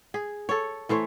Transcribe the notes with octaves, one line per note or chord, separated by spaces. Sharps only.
G#4
A4 C#5
E3 A3 C5 C#5